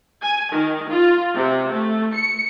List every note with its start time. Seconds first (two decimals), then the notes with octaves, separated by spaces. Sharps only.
0.22 G#5
0.52 D#3
0.89 F4
1.34 C3
1.72 A3
2.14 C#7